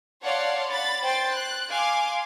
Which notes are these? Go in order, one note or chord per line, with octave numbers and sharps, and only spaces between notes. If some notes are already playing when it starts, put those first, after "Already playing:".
C#5 D5 F5 F#5 A5 C6
B5 A6
C5 G5 C6 A6
F#6
F5 G#5 C6 D6